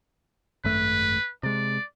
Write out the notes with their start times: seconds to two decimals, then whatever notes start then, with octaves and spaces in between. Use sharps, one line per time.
0.64 G#1 F#2 A3 B4
1.43 C3 G#3 D5